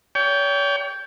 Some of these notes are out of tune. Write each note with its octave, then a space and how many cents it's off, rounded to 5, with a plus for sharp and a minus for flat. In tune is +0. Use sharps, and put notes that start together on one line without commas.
C#5 +40 G5 +0